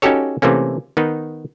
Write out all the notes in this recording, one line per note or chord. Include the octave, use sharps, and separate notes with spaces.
C#4 D#4 F#4 G4 A4 C#5
C3 E3 A3 A#3 C#4
D#3 B3 D#4